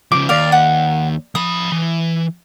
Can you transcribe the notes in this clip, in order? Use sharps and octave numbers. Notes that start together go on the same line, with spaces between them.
C#3 F3 D6
D#2 D5 F5
F#5
F3 B5 D#6
E3